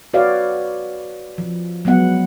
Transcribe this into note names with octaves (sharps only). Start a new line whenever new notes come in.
F#4 B4 C#5 D5 F5
F3
F#3 G#3 B3 F#5